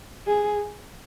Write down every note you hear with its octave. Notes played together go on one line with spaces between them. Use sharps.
G#4